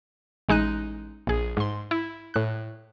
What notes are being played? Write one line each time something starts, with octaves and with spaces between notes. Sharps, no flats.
A1 G#3 D#4 F#6 D#7
A#1 G#4
G#2 C6
E4
A2 F#6